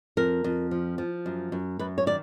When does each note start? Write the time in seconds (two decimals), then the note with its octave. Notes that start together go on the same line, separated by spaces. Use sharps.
0.17 F2 A#4
0.44 F2
0.71 F3
0.98 F3
1.26 F#2
1.52 F#2
1.79 F#2 B4
1.98 C#5
2.06 D#3 D5